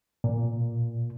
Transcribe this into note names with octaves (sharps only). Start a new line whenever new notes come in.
A#2